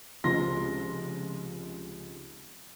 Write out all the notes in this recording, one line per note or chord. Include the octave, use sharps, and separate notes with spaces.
F1 C#2 F3 C6 A#6